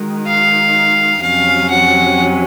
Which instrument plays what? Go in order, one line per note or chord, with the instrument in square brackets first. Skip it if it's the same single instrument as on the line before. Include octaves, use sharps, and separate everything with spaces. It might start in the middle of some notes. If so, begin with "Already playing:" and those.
Already playing: [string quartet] D#3 G#3 D#4 F#4
[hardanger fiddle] F5
[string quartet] F2 C3 F#3 C#4 [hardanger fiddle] F5
[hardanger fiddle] F#5